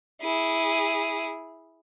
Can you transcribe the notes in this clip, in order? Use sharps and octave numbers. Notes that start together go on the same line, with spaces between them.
E4 G#4